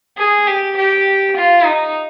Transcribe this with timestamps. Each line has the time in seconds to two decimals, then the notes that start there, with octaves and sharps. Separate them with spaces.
0.18 G#4
0.47 G4
0.76 G4
1.36 F4
1.65 D#4